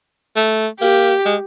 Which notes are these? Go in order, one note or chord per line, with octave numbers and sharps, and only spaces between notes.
A3
A#3 G4
G#3